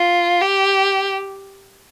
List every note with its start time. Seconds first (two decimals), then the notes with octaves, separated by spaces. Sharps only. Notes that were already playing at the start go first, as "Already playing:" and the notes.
Already playing: F4
0.41 G4